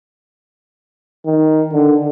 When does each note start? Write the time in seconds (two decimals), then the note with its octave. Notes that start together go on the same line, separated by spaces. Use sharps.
1.26 D#3
1.72 D3